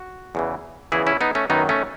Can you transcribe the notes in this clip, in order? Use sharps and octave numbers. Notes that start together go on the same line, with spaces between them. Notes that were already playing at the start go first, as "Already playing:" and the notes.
Already playing: F#4
E2 C#3 E3
E2 C#3 E3 E4 G#4
C#4 E4
B3 D#4
A3 C#4
F#2 D#3 F#3 B3 D#4
A3 C#4